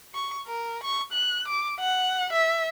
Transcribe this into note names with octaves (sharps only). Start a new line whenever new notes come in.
C#6
A#4
C#6
F#6
D6
F#5
E5